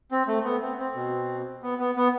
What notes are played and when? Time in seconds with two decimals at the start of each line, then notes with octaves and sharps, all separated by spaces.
0.11 C4
0.27 A3
0.44 B3
0.61 C4
0.78 C4
0.95 B2
1.63 B3
1.79 B3
1.96 B3